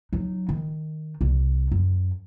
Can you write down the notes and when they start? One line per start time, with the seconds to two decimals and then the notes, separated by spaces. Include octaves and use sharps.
0.13 F#3 D#4
0.49 D#3
1.21 C2
1.72 F#2